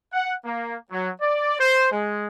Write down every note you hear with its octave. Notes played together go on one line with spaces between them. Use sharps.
F#5
A#3
F#3
D5
C5
G#3